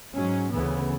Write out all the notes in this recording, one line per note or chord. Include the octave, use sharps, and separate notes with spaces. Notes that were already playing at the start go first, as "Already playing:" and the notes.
G#2 F#3 C#4
D2 C#3 E3 B3